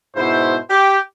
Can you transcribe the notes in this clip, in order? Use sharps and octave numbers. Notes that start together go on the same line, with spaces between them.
G#2 B2 E4 C5
G4